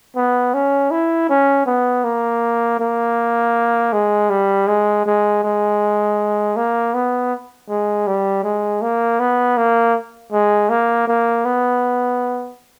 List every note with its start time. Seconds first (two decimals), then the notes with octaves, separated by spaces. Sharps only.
0.16 B3
0.54 C#4
0.91 E4
1.29 C#4
1.66 B3
2.04 A#3
2.80 A#3
3.93 G#3
4.30 G3
4.68 G#3
5.06 G#3
5.43 G#3
6.56 A#3
6.94 B3
7.69 G#3
8.07 G3
8.44 G#3
8.82 A#3
9.20 B3
9.57 A#3
10.32 G#3
10.69 A#3
11.07 A#3
11.45 B3